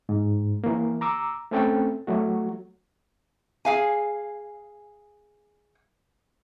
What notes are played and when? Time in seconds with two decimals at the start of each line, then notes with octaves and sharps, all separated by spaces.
0.09 G#2
0.64 E3 A#3
1.01 A#5 D6 E6
1.51 A3 C4 C#4 A4 G5
2.07 F#3 A3 F#4
3.65 G#4 F5 G#5